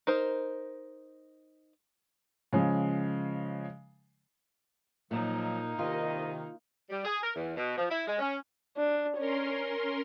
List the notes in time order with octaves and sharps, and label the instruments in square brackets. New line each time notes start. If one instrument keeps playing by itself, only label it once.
[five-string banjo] D#4 A#4 C5
[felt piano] C#3 F3 G#3
[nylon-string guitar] A#2 [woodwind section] D#3 F3 F#3 [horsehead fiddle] A#3 D#4
[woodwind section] C2 D#5 [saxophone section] C3 D#3 [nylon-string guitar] F4
[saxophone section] G3
G#4
A#4
E2
B2
F3
E4
G#3
C#4
[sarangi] D4
[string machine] C#4 A#4 C6 [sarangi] C#5